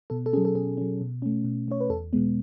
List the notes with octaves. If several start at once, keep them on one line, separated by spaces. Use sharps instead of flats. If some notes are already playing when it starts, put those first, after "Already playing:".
B2 A4
A4
F#3 C#4 G#4
A4
B2 G#4
F#3 C#4
B2
A3 C#4
B2
A3 C#4 C#5
B4
E2 A4
B2 G#3 B3